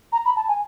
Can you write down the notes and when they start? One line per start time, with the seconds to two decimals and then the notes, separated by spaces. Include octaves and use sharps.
0.12 A#5
0.25 B5
0.36 A5
0.48 G#5